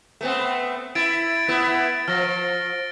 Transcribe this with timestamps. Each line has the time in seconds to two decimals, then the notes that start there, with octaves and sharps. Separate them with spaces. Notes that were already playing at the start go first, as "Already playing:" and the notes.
0.21 A3 B3 C4
0.95 E4 A6 D7
1.48 A3 B3 E4
2.08 F3 F6 A#6